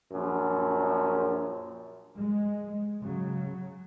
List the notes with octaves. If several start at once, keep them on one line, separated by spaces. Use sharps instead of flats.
A#1 F#2
G#3
C#3 F#3